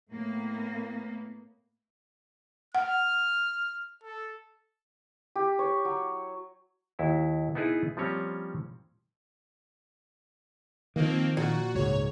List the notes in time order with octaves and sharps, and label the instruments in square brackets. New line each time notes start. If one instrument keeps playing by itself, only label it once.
[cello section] A2 A#3 B3
[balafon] F#5 [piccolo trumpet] F6
[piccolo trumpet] A4
[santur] G4
C#5
F#3
[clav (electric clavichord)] D#2 E4 F#4
B3 D#4 E4 G#4 B4
F3 G3 A#3 C4 C#4 C#5
[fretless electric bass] D#3 F3 [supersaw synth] A#3 C4
[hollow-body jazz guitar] A#2 [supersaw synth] F#4
[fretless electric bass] C#2 G#2 [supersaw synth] C#5